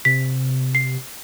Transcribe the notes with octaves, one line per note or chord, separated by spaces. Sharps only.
C3 B6
C7